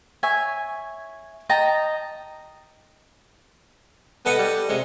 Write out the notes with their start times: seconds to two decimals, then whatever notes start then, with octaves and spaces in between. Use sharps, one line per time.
0.23 C#5 E5 G#5
1.49 D#5 G5 A5 A#5
4.26 B3 A4 D#5 F#5
4.38 G3
4.69 C3 G#3